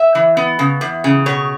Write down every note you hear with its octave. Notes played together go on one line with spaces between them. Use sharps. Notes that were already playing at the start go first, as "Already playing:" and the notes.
Already playing: E5
E3
B3
C#3
E2
C#3
B2 C#5